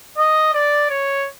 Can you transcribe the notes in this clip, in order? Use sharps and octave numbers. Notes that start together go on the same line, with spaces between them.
D#5
D5
C#5